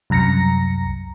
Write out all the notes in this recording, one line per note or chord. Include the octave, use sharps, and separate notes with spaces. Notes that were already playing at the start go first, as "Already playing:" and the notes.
C2 F#2 A#5 A#6 C#7